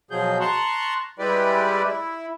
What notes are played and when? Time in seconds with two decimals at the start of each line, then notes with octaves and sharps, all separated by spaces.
0.11 B2 F3 F#3 G#4 G6
0.41 A5 A#5 C6 C#6 F#6
1.19 G3 G#3 E4 G4 B4 D5
1.85 E4